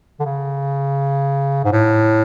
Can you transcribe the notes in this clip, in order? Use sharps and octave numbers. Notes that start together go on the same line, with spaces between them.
D3
C#3
G#2
A2